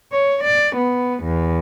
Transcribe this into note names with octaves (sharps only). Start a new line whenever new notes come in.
C#5
D5
B3
E2